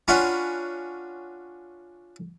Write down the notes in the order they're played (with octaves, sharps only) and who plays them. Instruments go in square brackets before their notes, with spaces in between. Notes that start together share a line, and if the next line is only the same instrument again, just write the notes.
[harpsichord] C#4 D4 F4 F#5 B5 C6